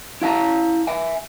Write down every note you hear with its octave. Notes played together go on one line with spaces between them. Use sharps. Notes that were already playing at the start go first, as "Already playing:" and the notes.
E4 F5 A5 A#5
E5 G#5